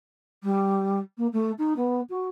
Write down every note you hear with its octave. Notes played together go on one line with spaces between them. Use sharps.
G3
A#3
A3
D#4
B3
F#4